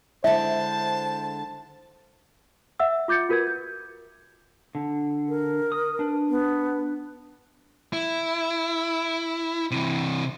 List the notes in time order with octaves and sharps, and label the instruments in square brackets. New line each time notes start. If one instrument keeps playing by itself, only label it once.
[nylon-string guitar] D3 G#3 E4 [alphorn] C5 [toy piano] E5 [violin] A5
[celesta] E5 F#5 E6
F4 D6 G6 A6 C#7
F4 F#4 A#4 B4 G#6
G6
[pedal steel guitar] D3
[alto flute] A#4
[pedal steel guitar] D#6
D4 B4
[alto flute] B3
[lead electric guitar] E4
C3 E3